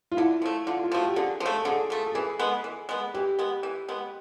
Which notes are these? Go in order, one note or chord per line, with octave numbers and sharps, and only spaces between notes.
F4
D3 E4
F3 A3
D3 F4
F4
F3 A3 F#4
G4
D3 G#4
F3
A3
A4
D3 G#4
F3 A3
A4
E3 G#4
G#3 B3
E3
G#3 B3
E3 G4
G#3 B3
E3
G#3 B3